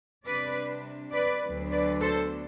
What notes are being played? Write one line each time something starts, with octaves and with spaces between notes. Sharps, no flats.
C3 G3 D4 B4 D5
B4 D5
D2 D3 F#3 B3 D4
B4 D5
A4 C5